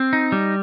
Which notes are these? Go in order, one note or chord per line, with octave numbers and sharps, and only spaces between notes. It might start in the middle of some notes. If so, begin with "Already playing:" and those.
Already playing: C4
D#4
G3